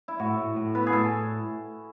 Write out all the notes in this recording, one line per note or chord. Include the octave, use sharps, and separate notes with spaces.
E4
A2 F#4
A2
A2
B3 B4
G#4
A2 A4